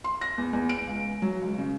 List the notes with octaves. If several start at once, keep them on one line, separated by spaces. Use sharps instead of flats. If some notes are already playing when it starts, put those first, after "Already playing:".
C6
A#6
E2
E2
D7
C#2
F#3
C#2
C#3